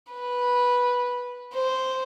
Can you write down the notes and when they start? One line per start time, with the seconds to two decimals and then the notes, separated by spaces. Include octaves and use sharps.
0.13 B4
1.54 C5